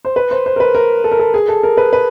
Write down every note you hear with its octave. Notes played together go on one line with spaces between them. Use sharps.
C5
B4
C5
C5
A#4
B4
A#4
A4
A#4
A4
G#4
A4
A#4
B4
B4